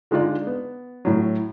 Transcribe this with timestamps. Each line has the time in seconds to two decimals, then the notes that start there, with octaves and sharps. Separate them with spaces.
0.11 D3 G#3 D#4 F4 D5
0.47 B3
1.05 A2 F#3